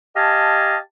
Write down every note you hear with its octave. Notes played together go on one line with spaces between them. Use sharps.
G4 D#5 F5 G#5 A5